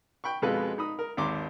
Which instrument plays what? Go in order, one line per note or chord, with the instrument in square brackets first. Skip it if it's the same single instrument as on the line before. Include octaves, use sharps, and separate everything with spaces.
[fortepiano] G5 B5 C#6
F2 B2 G#3 F4 A4 B4
D#4 B5 D#6
A#4
G#1 D#2 A#5 C6 D6